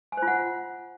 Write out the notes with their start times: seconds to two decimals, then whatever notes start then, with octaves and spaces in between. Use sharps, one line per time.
0.12 G#5
0.17 C5
0.22 F4
0.27 F#5